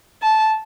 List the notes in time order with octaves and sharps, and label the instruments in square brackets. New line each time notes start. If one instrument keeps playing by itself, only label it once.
[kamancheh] A5